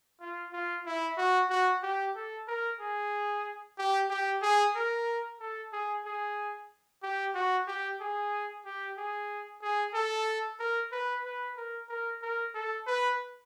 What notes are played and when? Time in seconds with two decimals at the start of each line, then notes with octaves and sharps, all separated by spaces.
0.21 F4
0.53 F4
0.86 E4
1.18 F#4
1.50 F#4
1.83 G4
2.16 A4
2.48 A#4
2.80 G#4
3.78 G4
4.10 G4
4.42 G#4
4.76 A#4
5.40 A4
5.73 G#4
6.06 G#4
7.03 G4
7.35 F#4
7.68 G4
8.01 G#4
8.66 G4
8.98 G#4
9.62 G#4
9.94 A4
10.60 A#4
10.92 B4
11.25 B4
11.57 A#4
11.89 A#4
12.22 A#4
12.54 A4
12.87 B4